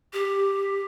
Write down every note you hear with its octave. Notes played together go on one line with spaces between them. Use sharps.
G4